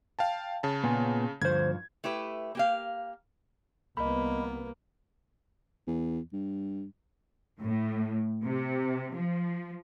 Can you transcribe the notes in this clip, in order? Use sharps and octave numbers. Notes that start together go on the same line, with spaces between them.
F5 G5 A5
C#3 A5
A#2 B3 G#5
D2 G2 F3 C5 G#6
A3 E4 G4 B4
A#3 G4 F5
C2 A#3 B3 D#5 B5
E2
G2
A2
C3
F3